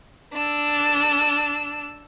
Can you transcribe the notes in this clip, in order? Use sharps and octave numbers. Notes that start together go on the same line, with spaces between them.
D4 E6